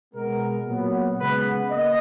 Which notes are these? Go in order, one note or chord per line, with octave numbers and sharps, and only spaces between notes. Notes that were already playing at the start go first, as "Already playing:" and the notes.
B2 G#3 B3 A#4
A#2 F#3 B3
C#3 G#3 B3 B4
A#3 D#5